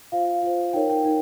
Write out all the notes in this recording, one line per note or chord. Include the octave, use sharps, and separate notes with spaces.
F4 C5 F5
F4 C5
D#4 A#4 C#5 G5
G5
D#4 A#4 C#5